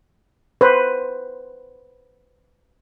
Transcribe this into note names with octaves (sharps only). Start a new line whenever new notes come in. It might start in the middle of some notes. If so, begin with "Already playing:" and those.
B4 C5